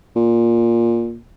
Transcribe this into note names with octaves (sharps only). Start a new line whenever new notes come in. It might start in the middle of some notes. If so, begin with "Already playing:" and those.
A#2